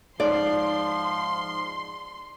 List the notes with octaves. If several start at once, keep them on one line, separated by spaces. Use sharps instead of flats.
G#2 F3 D5 C6